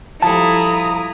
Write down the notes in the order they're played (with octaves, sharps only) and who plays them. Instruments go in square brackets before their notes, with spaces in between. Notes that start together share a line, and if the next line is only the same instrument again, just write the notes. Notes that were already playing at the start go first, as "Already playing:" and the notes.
[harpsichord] F3 G3 [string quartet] E4 [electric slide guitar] A4 A5 [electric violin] A#5 D#6